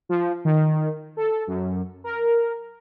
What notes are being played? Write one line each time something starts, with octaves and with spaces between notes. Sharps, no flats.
F3
D#3
A4
F#2
A#4